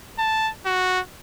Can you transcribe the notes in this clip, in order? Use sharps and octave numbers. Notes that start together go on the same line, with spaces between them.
A5
F#4